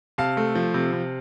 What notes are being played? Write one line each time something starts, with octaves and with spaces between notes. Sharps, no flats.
C3 F5 A5
A3
F3
C3
C3